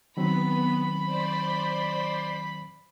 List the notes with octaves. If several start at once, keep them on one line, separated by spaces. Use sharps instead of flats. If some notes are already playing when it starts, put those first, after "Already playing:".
D#3 F#3 B3 C4 B5
C5 D5 C6